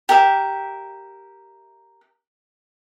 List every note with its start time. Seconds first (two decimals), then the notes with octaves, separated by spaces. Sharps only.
0.09 G4 A#4 E5